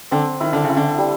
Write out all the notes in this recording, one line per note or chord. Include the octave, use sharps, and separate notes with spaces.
D3 C4
D#3 E4
D3
C#3
E4
D3
G3